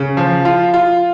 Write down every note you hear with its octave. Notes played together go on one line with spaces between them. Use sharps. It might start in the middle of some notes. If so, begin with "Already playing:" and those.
Already playing: C#3
F3
F4
F4